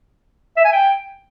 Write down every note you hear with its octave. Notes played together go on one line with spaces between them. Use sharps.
E5
G#5
G5